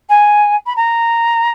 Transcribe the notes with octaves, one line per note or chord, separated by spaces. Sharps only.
G#5
B5
A#5